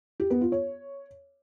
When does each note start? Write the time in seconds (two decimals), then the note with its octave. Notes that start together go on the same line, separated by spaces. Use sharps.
0.20 G4
0.30 B3
0.41 F4
0.52 C#5